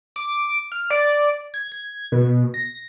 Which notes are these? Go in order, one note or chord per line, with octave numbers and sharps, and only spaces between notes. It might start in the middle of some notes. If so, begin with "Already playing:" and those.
D6
F6
D5
G#6
G#6
B2
A#6